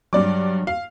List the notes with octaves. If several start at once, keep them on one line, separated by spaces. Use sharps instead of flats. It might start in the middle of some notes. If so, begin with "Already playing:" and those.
G2 F#3 D5 D6
F5